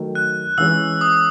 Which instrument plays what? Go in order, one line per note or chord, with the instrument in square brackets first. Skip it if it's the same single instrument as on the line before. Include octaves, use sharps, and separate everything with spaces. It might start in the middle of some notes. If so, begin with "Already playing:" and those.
Already playing: [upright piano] D#3 F#3 A3
[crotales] F#6
[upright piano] E3 G#3 C#4 [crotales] E6
[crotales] D#6